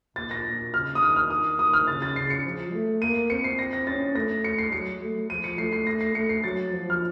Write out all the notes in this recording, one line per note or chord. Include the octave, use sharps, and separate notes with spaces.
A#2 A6
A#6
A#2
C#3 F6
D#6
D#3 F6
F6
D#6
D#6
F6
C#3 A6
A6
C#3 C7
C#7
F3
A3
A#3 D#7
C4 C#7
C7
A#6
A#6
C#4 A6
A3 A#6
C#7
C7
F#3 C#7
A3
F3 D#7
C#7
A3 C7
C7
A#6
C7
A3 C#7
C7
F#3 A6
F3
F6